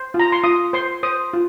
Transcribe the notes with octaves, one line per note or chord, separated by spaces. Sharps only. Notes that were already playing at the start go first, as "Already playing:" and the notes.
Already playing: C5
F4
A#5
C6
F4 D#6
C5 C6
C5 D#6
F4